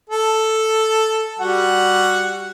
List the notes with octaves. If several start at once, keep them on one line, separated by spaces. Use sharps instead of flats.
A4
G3 F#4 F#5